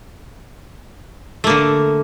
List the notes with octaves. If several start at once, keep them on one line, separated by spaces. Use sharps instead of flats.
D3 A3 A#3